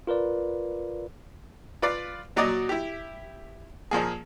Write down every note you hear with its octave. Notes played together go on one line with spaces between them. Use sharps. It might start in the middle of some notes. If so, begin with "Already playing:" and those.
F4 A#4 B4 D5
F4 B4 D5 F5
A#2 F#3 F#4 D5 D#5
E4 G4
A#2 F3 A#3 G#4